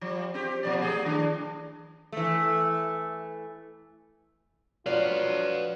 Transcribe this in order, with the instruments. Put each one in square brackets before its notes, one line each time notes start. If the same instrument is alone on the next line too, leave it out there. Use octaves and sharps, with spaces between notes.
[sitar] F3 G3
C4 G4
A#2 F3 D5
A3 G4 G#4
D#3 D4
E3 A3
[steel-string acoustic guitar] F3 A3 D5 [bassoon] F#3 [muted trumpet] F4 [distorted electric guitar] B4 F5